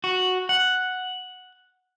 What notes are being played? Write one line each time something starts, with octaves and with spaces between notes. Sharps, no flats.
F#4
F#5